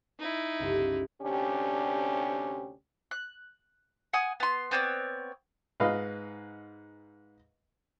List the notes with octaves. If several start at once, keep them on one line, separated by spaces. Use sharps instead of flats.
D#4 E4
G1 C#2
D2 C3 C#4 D4 G4
F#6
F#5 G#5 D#6
B3 C6
B3 C4 C#5 D5
G#2 B4 D#5 F5